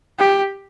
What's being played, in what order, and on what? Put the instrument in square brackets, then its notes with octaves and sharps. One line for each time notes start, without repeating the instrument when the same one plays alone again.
[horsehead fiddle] G4